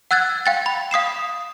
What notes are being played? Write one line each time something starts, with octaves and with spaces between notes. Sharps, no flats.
F#5 E6 F#6 G#6 A6
F5 G5 A6
B5
F5 D#6 C7 E7